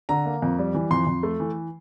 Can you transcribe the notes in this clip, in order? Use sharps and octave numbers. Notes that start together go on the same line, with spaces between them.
D3 A#5
A#3
F2
G3
E3
F2 C6
F2
A3
E3